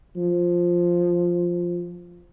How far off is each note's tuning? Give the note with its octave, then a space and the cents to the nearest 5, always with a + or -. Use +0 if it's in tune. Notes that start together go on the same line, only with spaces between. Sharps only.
F3 +0